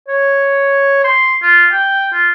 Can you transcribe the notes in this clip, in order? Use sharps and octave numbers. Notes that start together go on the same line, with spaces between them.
C#5
C6
F4
G5
F4